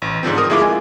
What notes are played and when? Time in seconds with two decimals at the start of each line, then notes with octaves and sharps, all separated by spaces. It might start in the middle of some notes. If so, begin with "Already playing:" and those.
0.02 A1
0.23 G#2 D3 F3 C4
0.38 A#4 D#6
0.50 G#3 A3 E4 F4 D6
0.62 G#5